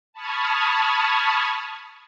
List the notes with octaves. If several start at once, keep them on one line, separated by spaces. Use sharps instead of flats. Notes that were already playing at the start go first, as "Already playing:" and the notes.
A5 B5 C#6 D#6 F6 G#6